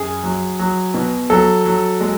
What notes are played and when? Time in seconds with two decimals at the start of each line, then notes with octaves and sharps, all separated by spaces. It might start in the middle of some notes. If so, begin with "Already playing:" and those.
Already playing: F#2 G#4
0.23 F#3
0.59 F#3
0.94 B2
1.30 F#3 A4
1.66 F#3
2.01 G#3